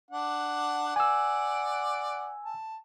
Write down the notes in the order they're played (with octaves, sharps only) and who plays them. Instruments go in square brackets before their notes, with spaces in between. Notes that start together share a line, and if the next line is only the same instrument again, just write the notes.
[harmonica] D4 F#5
[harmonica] D5 F#5 [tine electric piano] G#5 E6
[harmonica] A5